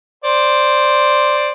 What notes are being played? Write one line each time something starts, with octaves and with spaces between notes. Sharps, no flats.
C5 D5